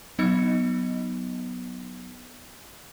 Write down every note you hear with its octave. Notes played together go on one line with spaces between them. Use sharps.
F#3 B3 D#4 D#5 C#7